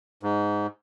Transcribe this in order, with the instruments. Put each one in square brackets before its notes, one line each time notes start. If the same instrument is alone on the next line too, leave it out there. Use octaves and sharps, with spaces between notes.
[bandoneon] G#2